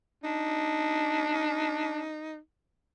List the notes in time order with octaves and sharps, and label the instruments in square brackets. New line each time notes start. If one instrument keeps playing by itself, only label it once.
[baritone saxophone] D4 [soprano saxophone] D#4